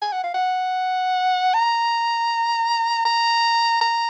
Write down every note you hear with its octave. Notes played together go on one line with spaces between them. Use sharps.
G#5
F#5
F5
F#5
A#5
A#5
A#5